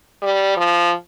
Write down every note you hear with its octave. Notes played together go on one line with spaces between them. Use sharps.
G3
F3